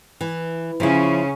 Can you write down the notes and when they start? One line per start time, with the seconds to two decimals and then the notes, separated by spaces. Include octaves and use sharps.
0.21 E3
0.80 C#3 F3 C#4 E4